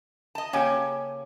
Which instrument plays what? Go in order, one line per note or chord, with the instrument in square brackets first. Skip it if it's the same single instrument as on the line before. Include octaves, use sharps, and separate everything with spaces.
[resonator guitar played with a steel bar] D#5 A5
[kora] C#3 G4 [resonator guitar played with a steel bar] A#3 G5 G#5